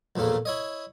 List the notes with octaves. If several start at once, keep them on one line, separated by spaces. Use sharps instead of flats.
A#1 E2 A2 A3 A#3
E4 C#5 D#5